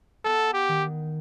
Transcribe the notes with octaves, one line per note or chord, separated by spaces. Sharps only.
B3 A4
G4
D#3